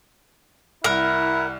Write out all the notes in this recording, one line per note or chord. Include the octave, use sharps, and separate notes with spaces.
C2 E4 A#4 F#5 F6